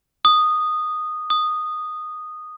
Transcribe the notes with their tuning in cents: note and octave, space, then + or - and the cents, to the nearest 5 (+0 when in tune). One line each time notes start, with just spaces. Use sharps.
D#6 -10
D#6 -10